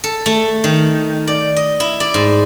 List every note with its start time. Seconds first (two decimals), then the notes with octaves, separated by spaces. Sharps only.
0.04 A4
0.26 A3
0.64 D#3
1.27 D5
1.56 D#5
1.80 E4
2.00 D5
2.14 G#2